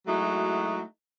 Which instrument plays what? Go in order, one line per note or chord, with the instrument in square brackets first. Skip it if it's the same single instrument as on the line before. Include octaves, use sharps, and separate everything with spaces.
[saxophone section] F#3 G#3 A3 D#4 E4 F#4